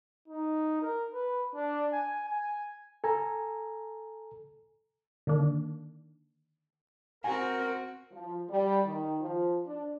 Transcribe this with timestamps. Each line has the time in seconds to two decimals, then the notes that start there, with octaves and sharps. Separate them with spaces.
0.28 D#4
0.82 A#4
1.14 B4
1.55 D4
1.93 G#5
2.29 G#5
3.04 A4 G#5 A#5
5.27 D3 D#3 A#3 D4
7.24 C4 F#4 A#4 G#5
8.11 F3
8.49 G3
8.84 D#3
9.21 F3
9.65 D4